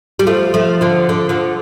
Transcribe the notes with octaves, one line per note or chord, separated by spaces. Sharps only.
G3
F3 A3
F3 A3
D3 F3
D3
D3 F3